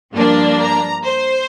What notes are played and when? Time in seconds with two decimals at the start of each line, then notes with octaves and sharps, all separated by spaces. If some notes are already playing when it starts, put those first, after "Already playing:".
0.15 G2 F3 A#3 D4
0.60 A#5
1.06 C5